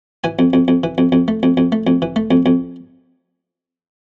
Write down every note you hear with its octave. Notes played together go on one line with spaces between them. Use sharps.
E3 G#5
F2
F2
F2
E3
F2
F2
A3
F2
F2
A3
F2
E3
A3
F2
F2